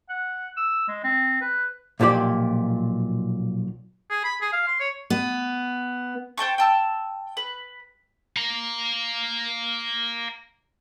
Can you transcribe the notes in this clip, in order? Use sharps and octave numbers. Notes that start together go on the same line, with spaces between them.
F#5
E6
G#3
C4
B4
B1 A#2 F3 G4 D5
G#4
B5
G#4
F5
C6
C#5
B3
C5 G5 A5 C#6
G5 A5 E6
B4
F5 A#5